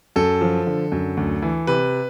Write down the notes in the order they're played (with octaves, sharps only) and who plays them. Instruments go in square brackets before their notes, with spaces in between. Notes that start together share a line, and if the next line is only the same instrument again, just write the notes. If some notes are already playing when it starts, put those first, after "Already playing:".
[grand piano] F#2 A4
F3
D3
F#2
D2
E3
C3 B4